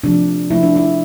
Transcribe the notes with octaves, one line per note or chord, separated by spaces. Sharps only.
C3 F3 A3 D4
C3 F3 A3 E4
D4
E4